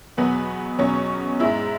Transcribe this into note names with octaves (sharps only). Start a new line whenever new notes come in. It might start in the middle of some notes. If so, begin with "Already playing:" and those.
E2 B2 F#3 B3 B4
E2 B2 F#3 C#4 C#5
G#2 G#3 E4 E5